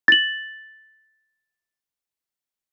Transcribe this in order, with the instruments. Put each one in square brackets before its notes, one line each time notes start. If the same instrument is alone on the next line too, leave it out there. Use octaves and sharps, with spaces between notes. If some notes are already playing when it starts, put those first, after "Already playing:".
[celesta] A6 F#7